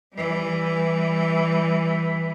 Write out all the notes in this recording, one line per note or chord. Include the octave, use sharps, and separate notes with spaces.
E3 G3